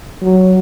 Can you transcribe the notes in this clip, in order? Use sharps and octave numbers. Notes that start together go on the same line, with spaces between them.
F#3